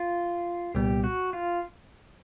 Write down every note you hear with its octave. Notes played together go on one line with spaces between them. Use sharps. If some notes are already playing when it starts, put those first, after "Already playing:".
Already playing: F4
C2 A#2 G3 B3 G4
F#4
F4